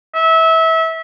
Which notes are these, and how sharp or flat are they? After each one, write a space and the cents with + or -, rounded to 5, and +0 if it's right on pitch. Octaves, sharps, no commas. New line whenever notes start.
E5 -25